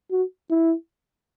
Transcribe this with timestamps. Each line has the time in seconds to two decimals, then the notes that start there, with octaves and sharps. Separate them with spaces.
0.11 F#4
0.50 E4